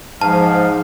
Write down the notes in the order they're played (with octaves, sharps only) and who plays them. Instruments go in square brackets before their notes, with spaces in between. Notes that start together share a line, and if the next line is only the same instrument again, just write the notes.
[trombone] G#2 [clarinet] F3 [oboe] F5 [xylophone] A5